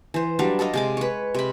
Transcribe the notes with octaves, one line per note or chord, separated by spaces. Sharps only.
E3 C5
F#3 G3 D4 F5
A4 D5 D#5 F5
C3 G#3 D6
B4 C#5
C3 B5